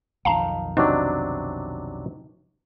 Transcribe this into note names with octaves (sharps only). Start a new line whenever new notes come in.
B1 F2 D#3 F5 A5 A#5
C3 F#3 D4 D#4